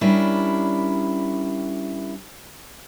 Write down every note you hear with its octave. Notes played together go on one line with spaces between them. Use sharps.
G3 C#4 D4 E4 A#4